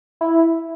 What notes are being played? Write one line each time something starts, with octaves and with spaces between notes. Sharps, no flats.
E4